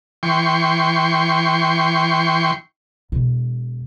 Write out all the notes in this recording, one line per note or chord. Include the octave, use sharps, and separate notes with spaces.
E3 G5 C6 C#6
E1 B2